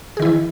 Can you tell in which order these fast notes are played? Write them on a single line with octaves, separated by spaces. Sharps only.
G#4 D#3 E4 E3